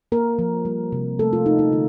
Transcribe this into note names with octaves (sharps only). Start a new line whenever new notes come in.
A#3 A#4
F3
G3
C3
A3 A4
F4
A3 D#4
D#4
D3 F4